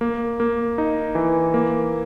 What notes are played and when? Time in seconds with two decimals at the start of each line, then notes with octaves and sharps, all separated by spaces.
0.01 A#3
0.40 A#3
0.78 D#4
1.15 E3
1.54 A#3